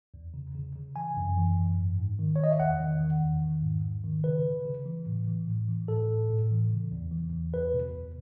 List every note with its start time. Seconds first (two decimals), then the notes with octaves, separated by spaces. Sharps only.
0.14 E2
0.34 C#3
0.55 C#3
0.75 C#3
0.95 E3 G#5
1.17 F#2
1.37 E3
1.58 F#2
1.78 G#2
1.98 G#2
2.19 D#3
2.36 C#5
2.40 D#3 D#5
2.51 E5
2.60 E2 F#5
2.80 D#3
3.01 D#3
3.22 E2
3.42 D#3
3.63 G#2
3.84 G#2
4.04 D#3
4.24 C#3 B4
4.45 C#3
4.65 C#3
4.86 E3
5.07 A2
5.28 E3
5.48 A2
5.69 E3
5.88 A2 A4
6.09 A2
6.30 A2
6.51 E3
6.71 C#3
6.92 E2
7.12 E3
7.32 E2
7.53 E2 B4
7.74 B2
7.95 E2